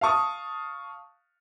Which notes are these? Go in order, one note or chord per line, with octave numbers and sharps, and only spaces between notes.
F5 A5 C#6 D#6